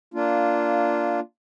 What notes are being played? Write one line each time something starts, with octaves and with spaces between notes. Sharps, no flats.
A#3 D4 F4